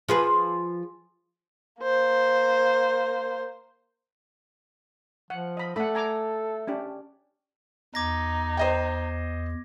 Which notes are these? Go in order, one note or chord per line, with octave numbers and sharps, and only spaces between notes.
F3 G#4 B4
A#3 C5
F3 F#5
D#5 B5
A3 A4 D5 F#5 B5
G#5 A#5 D6
C#4 D4 G4
E2 D#4 D6 G#6 A#6
C5 D#5 G5